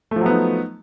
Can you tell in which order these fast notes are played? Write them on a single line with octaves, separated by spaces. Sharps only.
A3 F3 F#3 B3 D#4